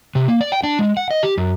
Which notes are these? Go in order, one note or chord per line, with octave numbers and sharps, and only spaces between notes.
C3
A#3
D5
G5
D4
G#3
F#5
D#5
G4
F#2